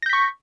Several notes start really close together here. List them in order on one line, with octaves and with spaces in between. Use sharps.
A#6 G6 B6 C#6